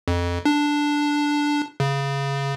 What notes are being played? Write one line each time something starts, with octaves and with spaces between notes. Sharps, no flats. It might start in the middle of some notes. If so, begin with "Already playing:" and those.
F2
D4
C#3